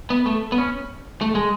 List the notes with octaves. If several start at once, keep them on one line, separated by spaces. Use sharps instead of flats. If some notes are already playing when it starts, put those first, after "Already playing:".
B3
A3
B3
C#4
A3
G#3